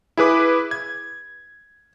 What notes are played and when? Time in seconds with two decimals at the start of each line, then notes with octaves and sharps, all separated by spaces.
0.17 E4 G#4 B4 D6
0.71 G#6